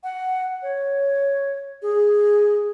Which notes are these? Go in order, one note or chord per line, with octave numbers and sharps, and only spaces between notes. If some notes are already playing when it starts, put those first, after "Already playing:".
F#5
C#5
G#4